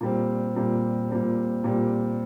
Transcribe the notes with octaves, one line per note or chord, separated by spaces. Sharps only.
A#2 G3 C4
A#2 G3 C4
A#2 G3 C4
A#2 G3 C4